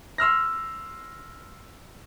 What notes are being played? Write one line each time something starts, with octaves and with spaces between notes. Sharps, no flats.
C6 E6 F6 A#6